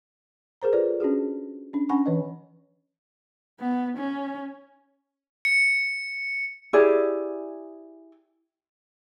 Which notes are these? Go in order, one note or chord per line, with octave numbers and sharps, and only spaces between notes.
G#4 A#4 C5 A#5
F4 A4 B4 D5
C#4 D4 F#4 G#4
C#4 D4
C#4 D4 F#5 G#5 B5 C#6
E3 B4 D#5
B3
C#4
C#7
E4 G4 G#4 D5